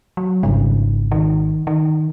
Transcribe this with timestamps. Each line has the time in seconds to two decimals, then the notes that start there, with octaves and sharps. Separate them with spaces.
0.17 F#3
0.43 G#1 G#2 C#3 G3
1.12 D#3
1.67 D#3